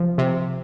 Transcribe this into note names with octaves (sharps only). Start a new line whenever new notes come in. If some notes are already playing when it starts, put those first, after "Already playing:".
Already playing: C3 F3
C3